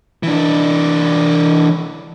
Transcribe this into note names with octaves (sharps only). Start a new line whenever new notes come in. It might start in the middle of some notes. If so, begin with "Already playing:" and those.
E3 D4